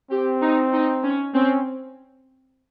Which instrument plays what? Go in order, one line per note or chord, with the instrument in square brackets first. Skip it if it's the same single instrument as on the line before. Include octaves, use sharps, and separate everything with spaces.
[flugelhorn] C4 [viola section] G4
[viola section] D#4
D#4
C#4
[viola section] C4 [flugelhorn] C#4